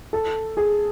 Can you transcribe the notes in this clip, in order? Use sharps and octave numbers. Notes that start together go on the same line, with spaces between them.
A4
G#4